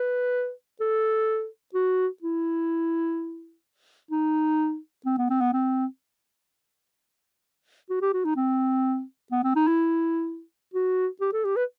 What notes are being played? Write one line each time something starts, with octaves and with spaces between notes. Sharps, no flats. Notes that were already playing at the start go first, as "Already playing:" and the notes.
Already playing: B4
A4
F#4
E4
D#4
C4
B3
C4
B3
C4
F#4
G4
F#4
D#4
C4
B3
C4
D#4
E4
F#4
G4
A4
G4
B4